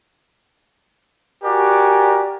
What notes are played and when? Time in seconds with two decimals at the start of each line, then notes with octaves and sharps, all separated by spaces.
1.44 F#4 G4 A#4 D5 G#5